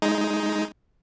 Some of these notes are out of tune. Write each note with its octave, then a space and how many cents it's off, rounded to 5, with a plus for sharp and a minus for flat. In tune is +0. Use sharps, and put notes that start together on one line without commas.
G#3 +10 D#4 +10